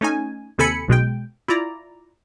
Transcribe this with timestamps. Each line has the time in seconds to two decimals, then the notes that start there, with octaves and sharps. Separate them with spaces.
0.01 A3 C#4 D#4 G#5
0.58 D#2 C3 A4 G#5 B5 C#7
0.88 B1 B2 G#3 G5
1.48 E4 F4 D5 A#5